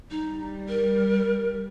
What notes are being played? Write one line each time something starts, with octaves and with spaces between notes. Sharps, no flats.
G3 D#4
A#4